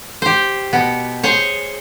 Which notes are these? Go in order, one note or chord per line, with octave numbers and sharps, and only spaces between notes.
G4 C5
B2 B3
G#4 C5 C#5